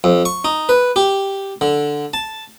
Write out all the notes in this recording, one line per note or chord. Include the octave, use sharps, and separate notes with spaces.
F2
C#6
D#4
B4
G4
D3
A5